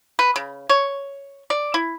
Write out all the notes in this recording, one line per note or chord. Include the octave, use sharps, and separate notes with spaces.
B4
C#3
C#5
D5
E4